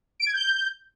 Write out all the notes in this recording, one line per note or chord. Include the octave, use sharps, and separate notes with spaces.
D7
G#6
G6